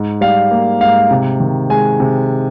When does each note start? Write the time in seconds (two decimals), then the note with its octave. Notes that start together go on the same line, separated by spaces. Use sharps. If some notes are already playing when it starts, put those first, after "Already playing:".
Already playing: G#2
0.21 G3 F5
0.51 A#3
0.81 G#2 F5
1.11 C3
1.40 D#3
1.70 G#3 G#5
2.00 C3